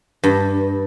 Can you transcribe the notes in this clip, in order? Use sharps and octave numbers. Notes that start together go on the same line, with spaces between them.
G2